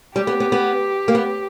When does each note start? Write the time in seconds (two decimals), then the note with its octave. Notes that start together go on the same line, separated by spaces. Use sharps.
0.16 G3 G4
0.27 B3
0.40 B3
0.52 B3
1.08 A#3
1.15 B3